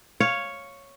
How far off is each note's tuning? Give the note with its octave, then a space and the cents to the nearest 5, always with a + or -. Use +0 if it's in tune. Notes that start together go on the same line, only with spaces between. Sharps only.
C#5 +0 F5 +0